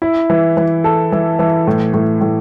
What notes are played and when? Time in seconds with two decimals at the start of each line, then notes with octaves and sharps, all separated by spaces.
0.02 E4
0.30 E3
0.57 E3
0.84 A4
1.12 E3
1.39 E3
1.67 A2
1.94 A2
2.21 A2